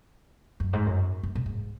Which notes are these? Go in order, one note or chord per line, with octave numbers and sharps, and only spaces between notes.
F#2
G#2
F#2
F#2
A#2
G#2